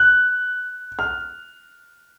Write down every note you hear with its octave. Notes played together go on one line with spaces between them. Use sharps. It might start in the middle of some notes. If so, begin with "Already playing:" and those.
Already playing: F#6
F6